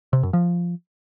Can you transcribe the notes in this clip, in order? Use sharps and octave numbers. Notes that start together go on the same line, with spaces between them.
C3
F#2
F3